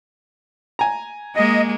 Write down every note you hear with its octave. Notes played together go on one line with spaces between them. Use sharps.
G#5 A#5
G#3 A#3 D#5